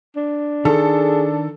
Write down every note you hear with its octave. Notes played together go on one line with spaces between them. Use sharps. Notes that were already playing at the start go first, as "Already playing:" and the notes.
D4
D#3 G#4 A4